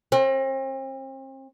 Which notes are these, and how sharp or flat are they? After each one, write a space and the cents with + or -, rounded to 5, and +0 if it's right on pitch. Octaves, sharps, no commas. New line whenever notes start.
C4 +40